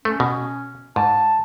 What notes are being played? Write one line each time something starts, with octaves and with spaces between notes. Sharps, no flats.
A3 C#4
B2
G#2 A5